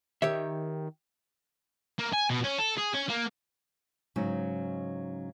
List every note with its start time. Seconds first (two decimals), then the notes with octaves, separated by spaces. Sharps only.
0.22 D#3 G4 C#5 E5
1.99 A#3
2.13 G#5
2.30 B2
2.44 C#4
2.59 A4
2.78 G#4
2.94 C#4
3.09 A#3
4.16 G#2 C#3 F#3 C#4 D#4